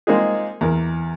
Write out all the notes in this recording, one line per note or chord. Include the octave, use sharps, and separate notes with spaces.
G#3 A#3 C4 D#4 F4 G#4
E2 A#4